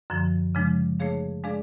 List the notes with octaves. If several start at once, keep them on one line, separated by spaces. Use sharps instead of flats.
F#2 D3 F3
C#3 F3 G#3 D4
A3 D4 G#4 C#5 F5
G#3 D4 G#4 D5 F5